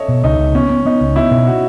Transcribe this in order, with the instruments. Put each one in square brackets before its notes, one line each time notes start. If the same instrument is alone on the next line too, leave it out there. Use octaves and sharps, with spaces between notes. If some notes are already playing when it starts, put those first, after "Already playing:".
Already playing: [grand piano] A4 C#5 D#5 E5
[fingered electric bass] B2
[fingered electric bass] C#2 [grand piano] D#4
[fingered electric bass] C#2
[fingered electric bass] B3 [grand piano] C#4
[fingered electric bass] B3
[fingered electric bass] B3 [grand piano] D#4
[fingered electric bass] C#2
[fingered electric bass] B3 [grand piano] E4
[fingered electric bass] B2
[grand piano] F#4